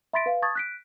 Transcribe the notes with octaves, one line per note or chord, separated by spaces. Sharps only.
E5 B5 C6 A6 B6 D7
B4 F5
A5 C#6 D#6 G#6 A6
F#6 B6 D7